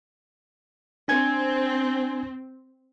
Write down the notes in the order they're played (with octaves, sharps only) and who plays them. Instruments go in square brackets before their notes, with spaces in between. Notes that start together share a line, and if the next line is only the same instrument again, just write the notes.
[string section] C4 [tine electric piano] D4 G#5 G#6